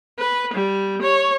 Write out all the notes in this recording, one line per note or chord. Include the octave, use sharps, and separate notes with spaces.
B4
G3
C#5